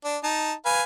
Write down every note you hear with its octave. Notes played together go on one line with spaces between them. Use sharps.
D4
D#4 A5
B4 F5 G#5